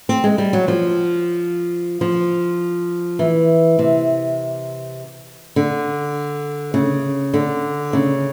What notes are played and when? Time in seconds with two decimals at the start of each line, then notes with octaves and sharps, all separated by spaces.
0.09 C4
0.24 G#3
0.38 G3
0.53 F#3
0.68 F3
2.01 F3
3.19 E3
3.79 C3
5.56 D3
6.74 C#3
7.34 D3
7.93 C#3